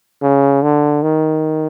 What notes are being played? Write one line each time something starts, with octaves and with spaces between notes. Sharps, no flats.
C#3
D3
D#3